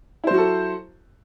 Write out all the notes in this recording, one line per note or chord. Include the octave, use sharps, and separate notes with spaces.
F#3 E4 F#4 A4 C5